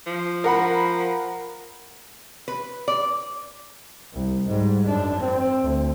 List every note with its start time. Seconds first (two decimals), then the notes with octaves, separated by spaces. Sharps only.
0.06 F3
0.44 A#4 F#5 B5
2.48 B4
2.88 D5
4.13 C2
4.47 G#2 G3
4.86 F#2 D4
5.19 C4
5.62 D2